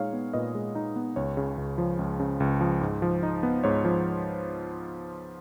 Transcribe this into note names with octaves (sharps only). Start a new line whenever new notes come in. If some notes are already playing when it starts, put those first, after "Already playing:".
Already playing: A#2 G#3 D#4 C#5 F5
B3
A#2 B4 D#5
G#3
D#4
B3
C#2 C#5
C#3
C#2
F3
C#2
C#3
C#2
F3
G#2
F3
D#4
B3
G#2 C#5
F3